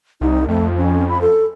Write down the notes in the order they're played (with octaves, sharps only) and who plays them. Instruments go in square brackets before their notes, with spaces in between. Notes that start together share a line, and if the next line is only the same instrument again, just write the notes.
[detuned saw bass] C2 [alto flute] D#4
[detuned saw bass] F2 [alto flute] A3
[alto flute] C#4
B5
A4